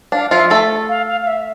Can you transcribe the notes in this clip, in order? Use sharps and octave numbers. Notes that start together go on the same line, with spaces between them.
D4 F5
F3 F4 E5
A3 A4 E5
F5
F5
F5
E5